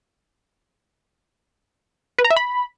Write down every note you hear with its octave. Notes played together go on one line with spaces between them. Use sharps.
B4
A#5
E5
B5